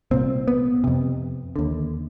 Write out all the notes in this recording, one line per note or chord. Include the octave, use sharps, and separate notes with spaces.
C2 A#2 C4
B3
F2 C3
D#2 D3